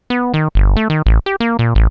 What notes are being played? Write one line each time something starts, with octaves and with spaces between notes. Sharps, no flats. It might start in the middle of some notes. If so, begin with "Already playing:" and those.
B3
D#3
G1
A3
D#3
A1
G4
A#3
A#2
A1